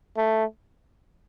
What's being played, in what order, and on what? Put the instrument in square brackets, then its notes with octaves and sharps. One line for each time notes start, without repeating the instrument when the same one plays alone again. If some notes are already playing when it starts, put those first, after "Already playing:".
[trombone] A3